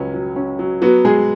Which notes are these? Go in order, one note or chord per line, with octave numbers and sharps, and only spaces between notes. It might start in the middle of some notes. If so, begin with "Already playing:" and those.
Already playing: C#2 F#3 C#4
F#3
C#4
F#3
F#3 B3 F#4
G#3 B3 G#4